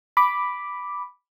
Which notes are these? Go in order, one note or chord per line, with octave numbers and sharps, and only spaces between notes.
B5 D6